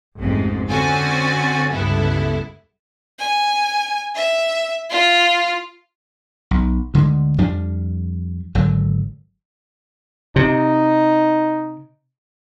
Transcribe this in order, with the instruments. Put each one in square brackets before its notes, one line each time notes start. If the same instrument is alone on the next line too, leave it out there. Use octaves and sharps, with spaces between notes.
[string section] A1 F2 G#2 C3 G#3
D3 C4 C#4 F#4 G#5 A6
G1 C#2 G2 B3 E4 A4
[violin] G#5
E5
F4
[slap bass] B1
D2 D3 G#3
F2 F3 G3 D4
G#1 D3 F#3
[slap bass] C3 [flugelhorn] D#4